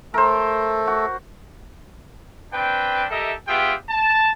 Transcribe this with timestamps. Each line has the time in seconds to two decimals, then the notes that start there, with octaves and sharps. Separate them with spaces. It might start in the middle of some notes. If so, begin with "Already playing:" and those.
0.14 A3 A4 A#4 C5
0.87 F#4
2.52 C4 D4 B4 G5
3.10 G4 A4 A#4 D#5 E5
3.48 B3 F4 G4 G#4 E5 G5
3.89 A5